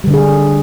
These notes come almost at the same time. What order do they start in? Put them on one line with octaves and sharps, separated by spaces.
G3 D3 D4 G#4